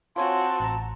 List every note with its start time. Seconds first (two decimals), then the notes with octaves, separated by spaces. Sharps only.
0.16 C4 F4 F#4 C#5 G#5 A5 C6
0.60 A1 A#5